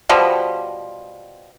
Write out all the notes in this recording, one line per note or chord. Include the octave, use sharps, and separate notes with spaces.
B2 F3 G3